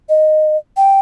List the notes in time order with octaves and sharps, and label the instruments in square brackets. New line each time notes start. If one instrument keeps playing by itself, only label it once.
[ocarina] D#5
G5